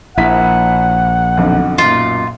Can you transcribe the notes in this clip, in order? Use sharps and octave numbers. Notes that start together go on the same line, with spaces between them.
A#1 E4 F#5 B6
B1 F2 D3
B1 F#2 A#2 F4